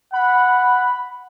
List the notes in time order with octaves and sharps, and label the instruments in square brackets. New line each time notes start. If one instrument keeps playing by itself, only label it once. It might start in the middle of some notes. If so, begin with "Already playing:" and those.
[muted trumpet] F#5 [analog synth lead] B5